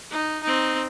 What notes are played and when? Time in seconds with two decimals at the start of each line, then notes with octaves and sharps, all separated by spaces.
0.11 D#4
0.43 C4 D#4